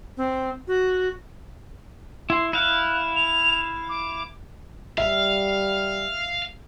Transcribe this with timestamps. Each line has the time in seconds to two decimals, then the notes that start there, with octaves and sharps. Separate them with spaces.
0.17 C4
0.68 F#4
2.30 E4 C6
2.53 E4 F5 F#6
3.15 F7
3.89 D6
4.98 G3 E5 F5